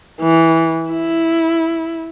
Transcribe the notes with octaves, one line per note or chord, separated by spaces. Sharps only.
E3
E4